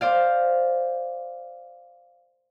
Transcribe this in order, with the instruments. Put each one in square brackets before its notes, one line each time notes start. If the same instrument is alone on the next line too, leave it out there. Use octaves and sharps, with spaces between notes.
[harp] C5 D5 F5